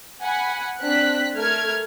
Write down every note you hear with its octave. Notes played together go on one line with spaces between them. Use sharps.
F#5 G#5 B5
C4 D4 F#6 B6
A3 A4 A#4 F6 G#6